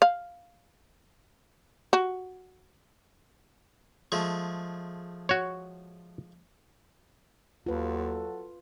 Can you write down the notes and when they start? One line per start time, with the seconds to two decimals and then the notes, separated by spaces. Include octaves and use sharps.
0.02 F5
1.93 F#4
4.12 F3 G#3 A3
5.29 F#4 C#5
7.66 D#2 F#3 F4 F#4 A4 B4